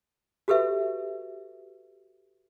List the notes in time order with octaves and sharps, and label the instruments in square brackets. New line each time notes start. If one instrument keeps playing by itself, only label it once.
[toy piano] F#4 G4 A4 B4 E5